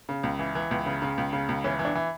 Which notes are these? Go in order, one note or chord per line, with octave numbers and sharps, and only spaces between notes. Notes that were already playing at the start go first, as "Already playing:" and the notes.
C#3
C#2
E3
E3
C#2
C#3
C#3
C#2
C#3
C#2
E3 C#4
E3
D4
E3